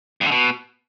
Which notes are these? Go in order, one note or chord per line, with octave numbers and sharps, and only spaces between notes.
F2
D3
B2